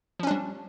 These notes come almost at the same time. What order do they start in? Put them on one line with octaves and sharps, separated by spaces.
F3 C#4 D4 G3